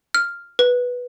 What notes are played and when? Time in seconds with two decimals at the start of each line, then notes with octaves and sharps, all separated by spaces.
0.14 F6
0.59 B4